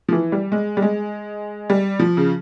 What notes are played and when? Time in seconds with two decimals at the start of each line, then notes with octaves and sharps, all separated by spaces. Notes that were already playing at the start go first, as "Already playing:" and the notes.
0.08 F3
0.12 E3
0.32 G3
0.52 G#3
0.77 G3
0.82 G#3
1.70 G3
1.99 F3
2.17 C#3